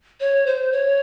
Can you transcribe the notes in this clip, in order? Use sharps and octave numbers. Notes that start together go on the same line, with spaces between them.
C#5
C5
C#5